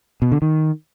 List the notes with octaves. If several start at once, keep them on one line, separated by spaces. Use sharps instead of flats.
B2
D3
D#3